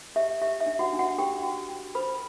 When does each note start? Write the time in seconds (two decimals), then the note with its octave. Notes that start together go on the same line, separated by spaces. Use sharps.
0.16 G4 E5
0.42 G4 E5
0.60 E5
0.66 D4
0.79 F#4 F#5
0.93 D4
0.99 F#4 F#5
1.18 F#4 G4 G5
1.43 F#4
1.70 F#4
1.95 B4 C5 B5